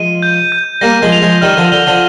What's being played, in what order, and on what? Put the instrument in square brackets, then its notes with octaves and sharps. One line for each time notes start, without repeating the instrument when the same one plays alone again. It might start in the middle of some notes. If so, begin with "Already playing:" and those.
Already playing: [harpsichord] F3 G#3 [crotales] D#7
[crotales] G6
G6
[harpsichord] G3 A#3 [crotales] A#6
[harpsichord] F3 G#3
[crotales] F7
[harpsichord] F3 G#3
[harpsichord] D#3 G3 [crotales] F6
[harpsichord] D3 F3
[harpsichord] D3 [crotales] G7
[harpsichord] D3 F3